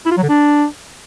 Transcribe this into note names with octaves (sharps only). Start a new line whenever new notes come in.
E4
F4
F#3
D3
D4